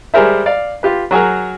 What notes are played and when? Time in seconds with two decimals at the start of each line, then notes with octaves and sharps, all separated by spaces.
0.14 G3 G#3 G#4 A#4 C5 E5
0.46 D5 F5
0.83 F4 G4 B4
1.11 F#3 F#4 G#4 A#4